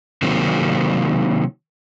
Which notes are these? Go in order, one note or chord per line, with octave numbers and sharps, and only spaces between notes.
C3 D#3 F#3 A#3 C4